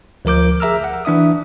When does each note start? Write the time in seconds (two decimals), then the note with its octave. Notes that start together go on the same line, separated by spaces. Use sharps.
0.25 D2 F3 A#4 D6 G6
0.60 G#4 E5 A#5 E6 F6
0.84 F#5
1.05 E3 D4 E5 D#6